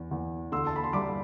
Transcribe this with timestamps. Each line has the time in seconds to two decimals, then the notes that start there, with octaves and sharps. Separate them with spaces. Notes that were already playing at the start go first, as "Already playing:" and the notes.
Already playing: E2
0.11 E2
0.52 D2 C6 E6
0.67 A5
0.76 B5
0.84 C6
0.93 G3 B5 D6